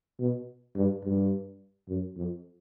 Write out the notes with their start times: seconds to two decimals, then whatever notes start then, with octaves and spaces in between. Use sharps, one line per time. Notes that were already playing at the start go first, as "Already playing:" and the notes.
0.19 B2
0.76 G2
1.04 G2
1.88 F#2
2.17 F2